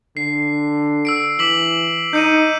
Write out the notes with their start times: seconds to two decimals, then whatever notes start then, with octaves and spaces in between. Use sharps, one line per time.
0.17 D3 C7
1.05 E6 C7 D7
1.39 E3 D6 B6 F#7
2.13 D#4 G6 C#7 D#7